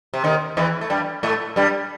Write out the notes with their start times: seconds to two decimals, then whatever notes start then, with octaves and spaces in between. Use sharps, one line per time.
0.14 C3
0.24 D#2 D#3
0.57 E2 E3
0.81 A3
0.90 G2 G3
1.23 A2 A3
1.56 G2 G3